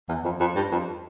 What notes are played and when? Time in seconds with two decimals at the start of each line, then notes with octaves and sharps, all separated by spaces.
0.09 E2
0.24 F2
0.40 F2
0.56 G2
0.72 F2